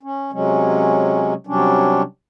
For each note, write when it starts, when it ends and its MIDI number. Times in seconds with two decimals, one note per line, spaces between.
0.03 0.32 61
0.33 1.34 48
0.33 1.34 54
0.33 1.34 56
0.33 1.34 61
1.47 2.02 48
1.47 2.02 54
1.47 2.02 55
1.47 2.02 61
1.47 2.02 62